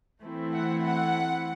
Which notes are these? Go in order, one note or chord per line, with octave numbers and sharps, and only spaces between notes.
E3 A3 C4 E4
F#5
F#5